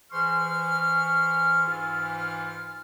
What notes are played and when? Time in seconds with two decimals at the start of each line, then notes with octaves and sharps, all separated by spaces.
0.12 E3 G#4 C5 C6 C#6 F6
1.66 G#2 E3 F4 A4 G#5 F6